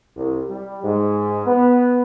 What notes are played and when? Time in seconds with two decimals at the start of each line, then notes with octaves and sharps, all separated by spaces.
0.16 C2
0.49 G3
0.84 G#2
1.47 B3